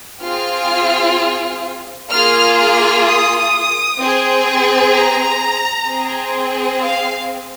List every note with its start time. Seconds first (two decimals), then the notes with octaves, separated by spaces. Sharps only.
0.22 C4 F4 G#4 F6
2.10 A#3 F4 G#4 F6
2.57 F6
3.04 D#6
3.99 C4 G#4
4.93 A#5
5.87 C4 G#4
6.81 F5